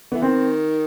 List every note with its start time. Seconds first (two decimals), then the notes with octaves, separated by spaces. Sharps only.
0.12 E3 B3
0.22 D#3 C4